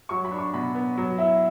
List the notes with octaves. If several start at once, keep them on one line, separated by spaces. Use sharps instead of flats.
F#3 C#6
B5
D4
C#6
B2 B5
B3
F#3
E4